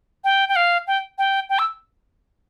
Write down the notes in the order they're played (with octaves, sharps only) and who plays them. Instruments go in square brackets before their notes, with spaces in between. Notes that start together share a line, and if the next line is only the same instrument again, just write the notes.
[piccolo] G5
G5
F5
G5
G5
G5
E6